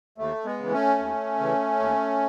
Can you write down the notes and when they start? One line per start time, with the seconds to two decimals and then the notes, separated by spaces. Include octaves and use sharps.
0.18 D#2 A3
0.45 G#3 B3
0.58 C#3 E3
0.71 A3 C#4
0.99 D#2
1.39 C#3 E3
1.79 D#2